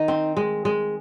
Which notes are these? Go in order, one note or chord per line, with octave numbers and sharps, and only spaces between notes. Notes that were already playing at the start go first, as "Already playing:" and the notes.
Already playing: D#3 D#4
C4
G#3
G#3